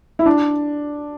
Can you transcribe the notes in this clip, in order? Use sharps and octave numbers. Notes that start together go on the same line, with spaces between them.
E4
D4